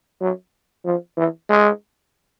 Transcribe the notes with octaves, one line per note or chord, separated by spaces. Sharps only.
F#3
F3
E3
G#3